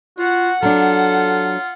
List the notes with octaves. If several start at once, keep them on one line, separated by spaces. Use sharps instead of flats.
F4 F#4 F#5
F#3 D4 F4 A4